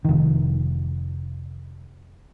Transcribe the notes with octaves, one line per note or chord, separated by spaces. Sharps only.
F1 D#3